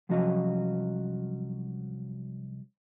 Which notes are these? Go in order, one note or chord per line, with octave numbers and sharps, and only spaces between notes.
C2 F3 F#3 C#4 F#4 D#5